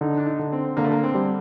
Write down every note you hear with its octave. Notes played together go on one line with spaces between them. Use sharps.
D3 D#4
D4
D#4
D3
C4
D3 A#3
A3
A#3
C4
G3